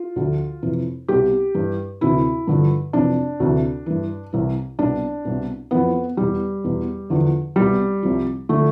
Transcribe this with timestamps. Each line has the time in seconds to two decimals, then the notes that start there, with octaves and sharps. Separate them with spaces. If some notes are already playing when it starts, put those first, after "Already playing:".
Already playing: F4
0.16 D2 D3 F3
0.63 F2 C3 E3
1.08 C2 B2 G4
1.54 G2 E3
2.01 D2 C3 E3 E4
2.47 G2 D3 F3
2.93 F2 C3 E3 D4
3.40 D2 C3 E3
3.86 G2 E3
4.33 C2 C3 E3
4.79 C2 B2 D4
5.25 C2 B2
5.71 F2 E3 B3
6.17 E2 B2 G3
6.64 E2 B2
7.10 E2 D3 F3
7.56 C2 B2 G3
8.03 C2 C3 F3
8.49 D3 F3 A3